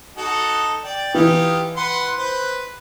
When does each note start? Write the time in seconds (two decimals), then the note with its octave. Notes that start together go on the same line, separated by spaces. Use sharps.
0.17 D#4 F#4 A4
0.84 D5 G5
1.15 E3 D#4 F4 G4
1.76 B4 F#5 C6
2.18 B4 C5